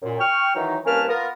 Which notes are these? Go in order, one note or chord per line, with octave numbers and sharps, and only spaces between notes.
F#2 A#2
G5 C#6 F6
D#3 E3 F#3 D#4
C2 A#3 C#4 B4 A5 F6
B3 F4 A#4